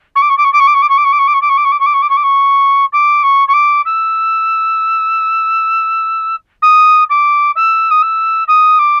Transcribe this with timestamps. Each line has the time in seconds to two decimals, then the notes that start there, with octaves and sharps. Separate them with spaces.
0.15 C#6
0.22 D6
0.29 C#6
0.37 D6
0.44 C#6
0.53 D6
0.60 C#6
0.67 D6
0.74 C#6
0.82 D6
0.89 C#6
0.98 D6
1.05 C#6
1.12 D6
1.19 C#6
1.27 D6
1.34 C#6
1.41 D6
1.49 C#6
1.57 D6
1.65 C#6
1.72 D6
1.80 C#6
1.86 D6
1.94 C#6
2.02 D6
2.10 C#6
2.17 D6
2.23 C#6
2.93 D6
3.23 C#6
3.48 C#6
3.54 D6
3.85 E6
6.62 D#6
7.10 D6
7.56 E6
7.91 D#6
8.02 E6
8.48 D#6
8.79 D6